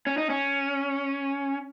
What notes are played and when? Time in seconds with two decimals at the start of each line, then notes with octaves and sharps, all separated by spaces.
0.07 C#4
0.18 D#4
0.30 C#4